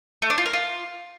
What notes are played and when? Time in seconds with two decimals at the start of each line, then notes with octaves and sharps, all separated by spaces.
0.22 A3
0.30 D4
0.38 F4
0.46 A#4
0.53 F4